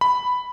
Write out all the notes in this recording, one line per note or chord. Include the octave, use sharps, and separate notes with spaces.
B5